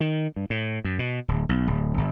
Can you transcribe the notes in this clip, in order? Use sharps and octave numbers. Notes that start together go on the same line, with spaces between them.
D#3
G2
A2
F#2
B2
D1
B1
D1
G1